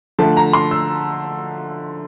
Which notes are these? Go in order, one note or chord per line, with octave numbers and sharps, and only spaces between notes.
D3 F3 A3 A5
A#5
C6
E6